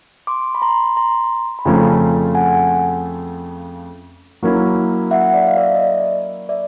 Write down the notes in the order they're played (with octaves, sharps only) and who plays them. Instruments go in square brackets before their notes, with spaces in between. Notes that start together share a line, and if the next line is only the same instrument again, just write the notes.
[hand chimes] C6 D6
B5
A#5 C6
A#5 C6
B5
[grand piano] F2 C#3 F3 A3 C#4 [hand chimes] G#5 A#5
[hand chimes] F#5 G#5
[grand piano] F#3 A#3 C#4 E4
[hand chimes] E5 F#5
D5 E5
F5
D5 E5
D#5
D5
D5 E5